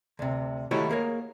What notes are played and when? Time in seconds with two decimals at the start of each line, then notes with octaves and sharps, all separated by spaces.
0.19 D2 C3
0.71 D#3 A3 E4 F#4 G4 C#5
0.89 A#3 G#4 A#4 C#5